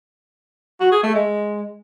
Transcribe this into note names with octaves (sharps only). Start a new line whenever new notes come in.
F#4
G#4
A3
G#3